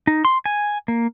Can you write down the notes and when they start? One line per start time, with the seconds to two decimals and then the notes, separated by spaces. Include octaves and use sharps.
0.07 D#4
0.25 C6
0.46 G#5
0.88 A#3